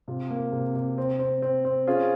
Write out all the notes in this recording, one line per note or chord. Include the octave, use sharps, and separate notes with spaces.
C3 F4
A#3
C3
C3
C4
C4
C4
C4
C#4 F4 G#4